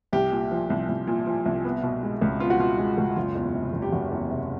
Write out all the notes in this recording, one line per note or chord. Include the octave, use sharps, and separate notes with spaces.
C2 G4
A#2
F3
C2
C2
A#2
F3
C2
B3
B2
G#3
C#2
B3 F4
F#4
B2 F4
G#3
C#2
F#1 F4
E2
C3
F#1
G4
F#1 F#4
E2
C3